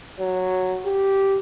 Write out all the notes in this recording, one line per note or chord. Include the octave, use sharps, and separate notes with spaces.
F#3
G4